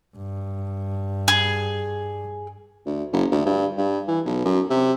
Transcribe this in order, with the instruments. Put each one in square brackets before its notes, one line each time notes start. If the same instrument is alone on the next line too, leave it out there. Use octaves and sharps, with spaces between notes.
[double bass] G2
[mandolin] G#4
[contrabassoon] D2
F#1
D2
G2
G2
E3
B1
F#2
C3